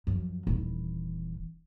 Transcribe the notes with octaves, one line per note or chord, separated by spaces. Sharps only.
F#2 F3
D#1 E3